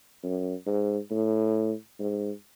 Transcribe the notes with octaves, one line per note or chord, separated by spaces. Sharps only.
F#2
G#2
A2
G#2